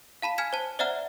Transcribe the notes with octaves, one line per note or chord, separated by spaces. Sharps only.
F5 A5 B5 B6
G#5 F6 G#6 B6 E7
C5 A5
C5 D5 E5 F#5 A#5 F6